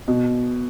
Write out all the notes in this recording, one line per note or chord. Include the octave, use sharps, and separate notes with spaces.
B2